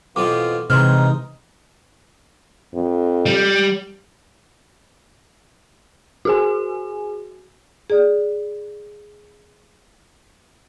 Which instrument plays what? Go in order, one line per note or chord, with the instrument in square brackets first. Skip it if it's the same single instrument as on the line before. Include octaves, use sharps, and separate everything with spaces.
[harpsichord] F2 B2 F3 [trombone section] E3 F4 [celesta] D6
[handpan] C3 [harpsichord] E3 G#3 [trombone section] C4 D#4 [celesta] C6 F6
[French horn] F2
[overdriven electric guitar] G3
[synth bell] F#4 G#4 G#5
[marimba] G#4 D5